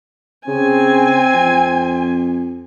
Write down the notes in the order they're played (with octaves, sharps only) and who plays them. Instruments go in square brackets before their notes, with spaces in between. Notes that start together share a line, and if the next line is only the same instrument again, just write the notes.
[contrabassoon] C#3 [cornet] C4 [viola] G#5
[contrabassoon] F2